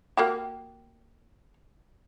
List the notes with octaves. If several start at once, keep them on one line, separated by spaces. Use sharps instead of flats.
A#3 F#4 G4